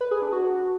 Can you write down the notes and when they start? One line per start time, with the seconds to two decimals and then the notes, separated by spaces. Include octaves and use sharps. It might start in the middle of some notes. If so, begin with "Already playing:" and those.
0.01 B4
0.11 G#4
0.22 D4
0.33 F#4